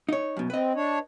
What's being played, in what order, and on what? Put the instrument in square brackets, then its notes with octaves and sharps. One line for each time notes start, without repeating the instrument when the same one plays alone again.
[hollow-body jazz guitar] D#4 C#5
F#2 B2
[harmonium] C4 [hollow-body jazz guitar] B4 D#5
[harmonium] D4 C#5